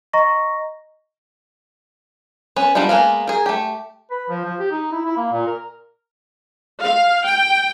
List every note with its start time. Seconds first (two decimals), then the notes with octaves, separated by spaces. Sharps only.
0.13 D#5 A#5 C#6 A#6
2.56 B3 C#4 B4
2.75 G3 B3 D4 D#4 F4
2.89 G#3 A#3 B3 F5
3.27 G#4 A#4
3.46 A3 G4
4.10 B4
4.30 F3
4.45 F3
4.59 G4
4.71 D#4
4.92 E4
5.05 E4
5.17 A#3
5.32 A#2
5.47 A#4
6.81 F5
7.24 G5